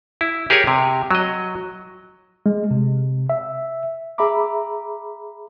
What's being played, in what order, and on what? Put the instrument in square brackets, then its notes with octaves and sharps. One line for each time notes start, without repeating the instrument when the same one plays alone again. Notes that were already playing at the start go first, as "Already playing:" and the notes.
[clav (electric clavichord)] E4
G4 G#4 A#4 C#5 G#5
C3
F#3 D#5
[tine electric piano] G#3
C3
E5
[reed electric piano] G#4 E5 A#5 B5 D6